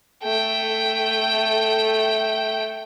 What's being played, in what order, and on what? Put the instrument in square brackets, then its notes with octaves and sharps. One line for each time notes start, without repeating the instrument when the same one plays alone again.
[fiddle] A3 G5